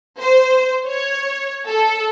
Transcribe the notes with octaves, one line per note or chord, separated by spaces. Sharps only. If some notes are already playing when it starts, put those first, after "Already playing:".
C5
C#5
A4